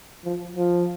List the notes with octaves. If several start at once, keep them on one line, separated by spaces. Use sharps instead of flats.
F3
F3